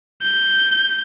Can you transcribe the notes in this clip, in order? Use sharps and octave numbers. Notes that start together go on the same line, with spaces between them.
G6